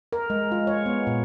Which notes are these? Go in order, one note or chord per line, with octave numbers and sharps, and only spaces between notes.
A#4
G#3
F4
C#5
B3
A#2